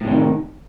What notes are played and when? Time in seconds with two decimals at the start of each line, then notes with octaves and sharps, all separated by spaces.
0.01 A2
0.04 C3
0.08 F#3
0.11 D#3